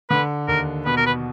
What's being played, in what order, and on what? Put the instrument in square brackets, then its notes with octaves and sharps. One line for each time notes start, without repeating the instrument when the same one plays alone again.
[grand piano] D3 [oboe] B4
[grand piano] D#2 [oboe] A#4
[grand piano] B2 [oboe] B4
[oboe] A#4
B4